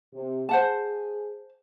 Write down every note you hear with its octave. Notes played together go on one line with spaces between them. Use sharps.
C3
G#4 C5 F#5 A5